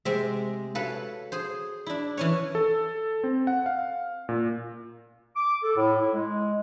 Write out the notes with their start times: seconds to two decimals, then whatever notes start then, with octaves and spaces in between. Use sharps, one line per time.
0.05 C3 G#3 C4 E5
0.75 F#4 A4 B4 C#5 F5
1.32 G#4 C5
1.86 D4 E4
2.17 E3 C#4 C#5
2.55 A4
3.24 C4
3.47 F#5
3.66 F5
4.29 A#2
5.36 D6
5.63 A4
5.76 A2
6.00 E4
6.14 G#3